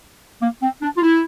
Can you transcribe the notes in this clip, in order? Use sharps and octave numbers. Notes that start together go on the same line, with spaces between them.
A#3
C4
D4
F4
E4